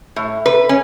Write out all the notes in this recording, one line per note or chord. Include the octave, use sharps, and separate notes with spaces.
A2
B4
C#4